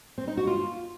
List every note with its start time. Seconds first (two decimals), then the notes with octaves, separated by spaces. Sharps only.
0.18 C4
0.28 D#4
0.37 F#4
0.47 F4